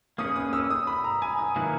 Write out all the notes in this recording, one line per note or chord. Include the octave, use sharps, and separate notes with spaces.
A#3 C#4 G#4 B4 D#6
D#6
E6
D#6
B5
A#5
G#5
D#6
D#3 F#3 A#3 E4 B4